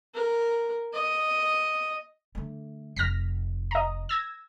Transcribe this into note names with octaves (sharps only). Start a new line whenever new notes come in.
A#4
D#5
D3 A3
F1 D#4 F6 A#6 B6
D#5 A#5
E6 G#6 A#6